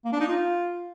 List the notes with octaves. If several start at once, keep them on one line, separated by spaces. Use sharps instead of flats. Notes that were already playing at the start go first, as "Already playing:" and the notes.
A#3
D4
D#4
F4